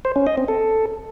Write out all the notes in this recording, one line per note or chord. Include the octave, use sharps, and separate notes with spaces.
C5
C#4
D#5
C4
A4